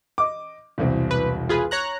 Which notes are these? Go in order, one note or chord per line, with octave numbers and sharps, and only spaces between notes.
D#5 D6
E1 C2 C4
B4
F4 G#4 B4
C#5 A#5 F#6